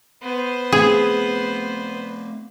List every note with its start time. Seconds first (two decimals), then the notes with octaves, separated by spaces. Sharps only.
0.22 B3 C5
0.72 A3 C4 G#4